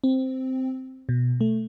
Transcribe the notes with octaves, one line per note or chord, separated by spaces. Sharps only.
C4
B2
A3